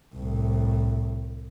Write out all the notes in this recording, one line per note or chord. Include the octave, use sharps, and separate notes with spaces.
C2 A2